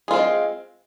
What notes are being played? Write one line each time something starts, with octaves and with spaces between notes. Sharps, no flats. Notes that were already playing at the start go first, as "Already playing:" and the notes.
G#3 C4 F4 G#4